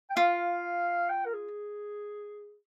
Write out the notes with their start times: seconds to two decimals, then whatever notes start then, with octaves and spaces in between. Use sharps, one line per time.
0.10 G5
0.16 F4 F5
1.10 G5
1.26 A#4
1.34 G#4